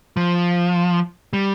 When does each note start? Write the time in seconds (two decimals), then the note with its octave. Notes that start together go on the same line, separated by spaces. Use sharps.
0.17 F3
1.33 G3